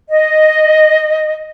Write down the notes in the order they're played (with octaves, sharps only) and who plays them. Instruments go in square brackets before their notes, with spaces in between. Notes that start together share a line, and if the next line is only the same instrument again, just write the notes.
[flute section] D#5